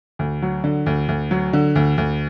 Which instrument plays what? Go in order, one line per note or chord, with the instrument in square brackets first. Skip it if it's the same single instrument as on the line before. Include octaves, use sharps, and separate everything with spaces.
[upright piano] D2
F#3
D3
D2
D2
F#3
D3
D2
D2